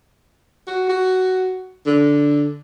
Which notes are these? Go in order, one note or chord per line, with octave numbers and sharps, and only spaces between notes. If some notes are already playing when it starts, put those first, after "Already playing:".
F#4
F#4
D3